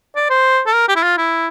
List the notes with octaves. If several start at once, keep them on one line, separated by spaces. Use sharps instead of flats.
D5
C5
A4
A#4
G4
E4
F4
E4